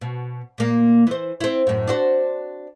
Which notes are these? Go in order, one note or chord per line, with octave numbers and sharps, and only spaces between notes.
B2
A#2 A#3
E3 C5
C4 E4
F#2 A2
D4 F#4 C5